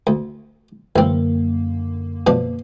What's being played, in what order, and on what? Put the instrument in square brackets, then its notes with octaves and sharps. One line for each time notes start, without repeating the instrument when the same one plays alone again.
[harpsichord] D2
[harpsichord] A1 C4 [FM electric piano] F#2 D3 A#3
[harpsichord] B2 F3 D4